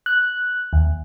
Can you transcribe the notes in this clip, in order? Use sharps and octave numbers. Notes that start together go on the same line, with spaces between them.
F#6
D#2